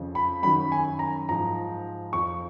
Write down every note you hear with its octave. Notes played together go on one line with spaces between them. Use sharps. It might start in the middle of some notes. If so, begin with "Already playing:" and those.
Already playing: F2 C#3 F3
B5
F#2 D#3 F#3 B5
G#5
A#5
G#2 F3 A#5
F2 F3 C#6